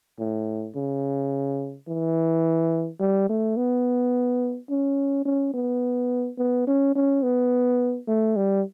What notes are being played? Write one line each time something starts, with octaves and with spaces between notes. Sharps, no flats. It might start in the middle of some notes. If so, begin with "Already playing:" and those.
A2
C#3
E3
G3
A3
B3
C#4
C#4
B3
B3
C#4
C#4
B3
A3
G3